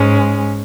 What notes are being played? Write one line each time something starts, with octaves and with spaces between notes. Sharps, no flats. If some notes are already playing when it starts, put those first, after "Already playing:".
Already playing: G#2 G#3 C#4